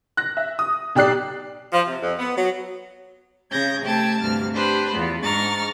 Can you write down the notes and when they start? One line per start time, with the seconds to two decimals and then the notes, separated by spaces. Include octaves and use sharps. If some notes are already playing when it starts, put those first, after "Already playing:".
0.17 F#6 A#6
0.37 E5
0.59 D#6
0.95 B1 G4 D5 F#6 C7
1.72 F3
1.86 C3
2.02 F2
2.18 B3
2.36 F#3
3.51 C#3 G6 G#6 A#6
3.83 C3 A3 G5 A5 G#6
4.21 D2 G2 C3 F6
4.54 D4 G4 B4 C5
4.92 E2 B3 F4
5.23 G#2 D4 A#5 C#6 F6 A6